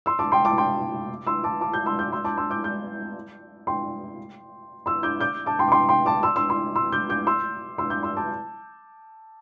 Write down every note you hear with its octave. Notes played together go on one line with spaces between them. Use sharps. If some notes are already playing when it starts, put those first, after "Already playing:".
C6 E6
A5 D6
G5 C6
A5 D6
G5 C6
C6 E6
A5 D6
A5 D6
D6 G6
C6 E6
D6 G6
C6 E6
A5 D6
C6 E6
D6 G6
D6 G6
G5 C6
C6 E6
D6 G6
D6 G6
A5 D6
G5 C6
D6
G5 C6
G5 C6
A5 D6
C6 E6
C6 E6
C6 E6
C6 E6
D6 G6
D6 G6
C6 E6
C6 E6
D6 G6
C6 E6
A5 D6